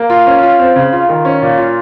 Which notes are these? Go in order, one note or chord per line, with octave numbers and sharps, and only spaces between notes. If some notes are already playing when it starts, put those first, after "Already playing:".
Already playing: A#3
F4
C#4
F4
C4
C#3
F4
D#3
C#4
A#2
F4